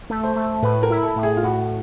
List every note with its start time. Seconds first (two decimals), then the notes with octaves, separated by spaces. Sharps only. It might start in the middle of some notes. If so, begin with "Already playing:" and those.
0.10 A3
0.23 C5
0.36 A3
0.62 A2 B4
0.83 A#4
0.90 E4
1.03 A4
1.16 A2
1.23 G#4
1.37 F4
1.43 A2 F#4